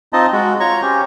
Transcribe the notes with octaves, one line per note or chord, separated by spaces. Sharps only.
C4 D#4 F4 D#5 A5
G#3 F#4
F4 C#5 A#5 C#6
C#4 G4 C5